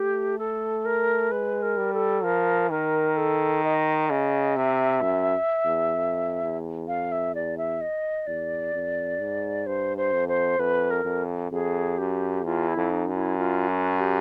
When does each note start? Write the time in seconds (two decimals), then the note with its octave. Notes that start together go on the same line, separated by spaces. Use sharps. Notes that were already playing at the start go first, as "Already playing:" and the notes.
Already playing: A3 G4
0.39 A4
0.85 A#4
1.32 G#3 B4
1.62 A#4
1.77 G3
1.94 A4
2.24 F3 A#4
2.71 D#3 A#4
3.17 A4
3.64 D#5
4.09 C#3 D#5
4.56 C3 E5
5.02 F#2
5.65 E2
5.95 F2
6.42 E2
6.88 F2 F5
7.12 E5
7.35 E2 D5
7.58 E5
7.81 D#5
8.27 E2 D5
8.74 F2
9.20 G#2
9.66 G2 C5
9.98 C5
10.13 F2
10.28 C5
10.59 F2 B4
10.91 A#4
11.05 F2
11.52 F2 G#4
11.98 F#2 G4
12.44 E2 F4
12.68 E4
12.76 F2
12.91 D#4
13.07 F#2
13.14 E4
13.38 F4
13.69 F#4
14.00 G4